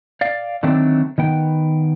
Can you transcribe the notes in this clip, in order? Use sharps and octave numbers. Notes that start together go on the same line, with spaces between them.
D5 F5
D3 D#3 F#3 A3 C4 D4
D#3 B3 G5